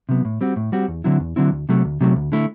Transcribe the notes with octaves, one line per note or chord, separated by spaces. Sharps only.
C3 F#3 B3
A2
G3 C4 F#4
A2
G3 C4 F#4
E2
D3 F#3 C4 E4
E2
D3 F#3 C4 E4
D2
C3 F#3 A3
D2
C3 F#3 A3
D2
D3 A3 E4